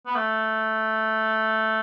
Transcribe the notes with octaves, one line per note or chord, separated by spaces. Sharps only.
B3
A3